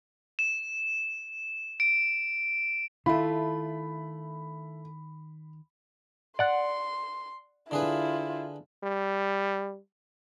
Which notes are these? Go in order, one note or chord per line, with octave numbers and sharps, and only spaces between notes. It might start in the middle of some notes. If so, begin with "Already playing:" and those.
E7
D7
D#3 A3 E4 F4 B5
D5 F#5 C6
D3 E4 F4 G#4 B4
G3